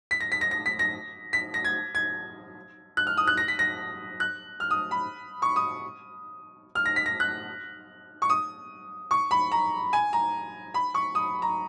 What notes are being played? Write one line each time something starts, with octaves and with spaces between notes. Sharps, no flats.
B6
A#6
B6
A#6
A#6
B6
A#6
B6
A#6
G#6
G#6
F#6
F6
D#6
F#6
A#6
B6
A#6
F#6
F6
D#6
B5
C#6
D#6
F6
A#6
B6
A#6
F#6
C#6
D#6
C#6
B5
A#5
G#5
A#5
B5
C#6
D#6
A#5